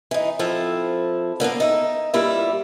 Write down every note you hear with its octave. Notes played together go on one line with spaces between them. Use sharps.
E3 D#4
F3 C4 E4 A4
D3 A#3 B3 D4
D#4 E5
G2 G3 A#3 E4 F4 E5